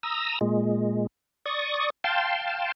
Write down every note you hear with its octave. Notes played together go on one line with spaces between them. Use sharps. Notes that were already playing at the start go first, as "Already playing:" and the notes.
A#5 D#6 E6
A#2 G#3
D5 C#6 D#6
F5 G5 A5 C6